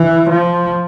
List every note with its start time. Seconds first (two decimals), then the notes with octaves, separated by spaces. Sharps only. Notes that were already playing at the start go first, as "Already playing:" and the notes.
Already playing: E3
0.30 F3